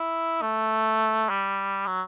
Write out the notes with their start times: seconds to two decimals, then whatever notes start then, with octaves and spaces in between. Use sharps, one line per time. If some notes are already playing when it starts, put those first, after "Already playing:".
Already playing: E4
0.42 A3
1.29 G3
1.87 F#3